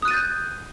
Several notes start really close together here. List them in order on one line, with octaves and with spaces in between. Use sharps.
D#6 F#6 D#7 A6 G6